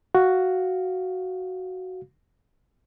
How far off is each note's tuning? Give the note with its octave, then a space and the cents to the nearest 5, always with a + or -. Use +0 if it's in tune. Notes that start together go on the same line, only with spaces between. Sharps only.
F#4 +5 F5 +0